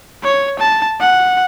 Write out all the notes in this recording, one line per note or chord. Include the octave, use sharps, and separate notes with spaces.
C#5
A5
F#5